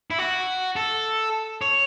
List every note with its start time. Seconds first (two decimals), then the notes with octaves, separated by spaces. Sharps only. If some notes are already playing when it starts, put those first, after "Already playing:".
0.11 E4
0.19 F#4
0.76 A4
1.62 C#5